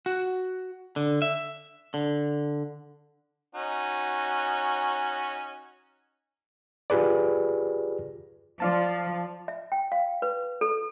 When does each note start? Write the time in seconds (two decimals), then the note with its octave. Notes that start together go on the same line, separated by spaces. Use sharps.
0.06 F#4
0.96 D3
1.22 E5
1.94 D3
3.55 C#4 D#4 F#4
6.90 F4 G4 G#4 B4 D5
8.60 F3 D5 F5 A5
9.48 E5
9.72 G5
9.92 F5
10.22 B4
10.61 A4